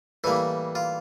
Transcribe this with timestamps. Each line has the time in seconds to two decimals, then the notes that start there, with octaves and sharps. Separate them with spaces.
0.24 A2 E3 G3 A#3 E4
0.75 F4